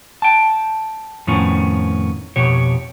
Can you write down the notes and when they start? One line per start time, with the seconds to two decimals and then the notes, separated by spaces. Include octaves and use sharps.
0.22 G5 A5
1.27 F2 A2 D#3 B3 C#4
2.36 F2 B2 G4 C#5